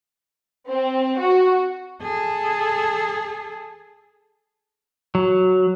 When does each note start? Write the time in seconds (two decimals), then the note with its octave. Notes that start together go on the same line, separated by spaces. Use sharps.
0.70 C4
1.21 F#4
2.02 G#4 A4
5.15 F#3